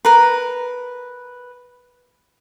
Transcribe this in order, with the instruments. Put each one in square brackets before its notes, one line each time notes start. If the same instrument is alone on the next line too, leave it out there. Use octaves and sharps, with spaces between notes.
[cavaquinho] A#4 B4